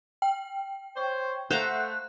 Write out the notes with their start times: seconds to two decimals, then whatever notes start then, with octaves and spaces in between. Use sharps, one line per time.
0.22 G5
0.96 C5 C#5
1.51 A3 C5 F5 F#5 A#5 F#6